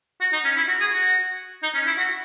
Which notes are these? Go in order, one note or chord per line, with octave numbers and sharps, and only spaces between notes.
F#4
D#4
C#4
E4
F#4
G#4
F#4
D#4
C#4
E4
F#4